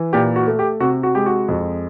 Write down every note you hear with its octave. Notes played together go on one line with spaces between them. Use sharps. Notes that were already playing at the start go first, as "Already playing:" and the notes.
Already playing: E3
A#2 G4
F#4
A3
G4
C3 F#4
F#4
G#3 G4
F#4
F2